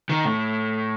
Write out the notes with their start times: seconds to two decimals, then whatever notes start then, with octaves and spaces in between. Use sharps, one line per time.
0.09 D#3
0.25 A2